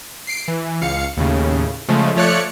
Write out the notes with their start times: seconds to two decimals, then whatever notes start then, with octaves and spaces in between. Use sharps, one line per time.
0.27 C7 D7
0.48 E3
0.82 C#2 F5 C#7
1.17 D#2 A2 C#3
1.89 C#3 F3 G#3 A3
2.16 F3 A3 C#5 D5 F#6 C#7